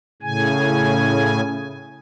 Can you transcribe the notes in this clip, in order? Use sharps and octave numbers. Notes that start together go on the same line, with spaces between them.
A2 C#3 G#5